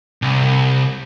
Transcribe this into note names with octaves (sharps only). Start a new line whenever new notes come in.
C2